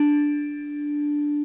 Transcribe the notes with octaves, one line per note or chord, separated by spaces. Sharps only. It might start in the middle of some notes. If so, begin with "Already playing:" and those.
Already playing: D4